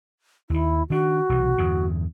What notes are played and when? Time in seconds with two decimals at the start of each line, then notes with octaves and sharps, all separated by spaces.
0.50 D#2 D#3 E4
0.90 D#3 D4 F#4
1.29 B1 C3 E3
1.58 E2 G2 D3